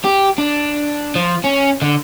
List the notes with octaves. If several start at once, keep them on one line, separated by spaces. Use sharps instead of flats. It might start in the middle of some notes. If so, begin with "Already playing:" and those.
G4
D4
F3
C#4
D3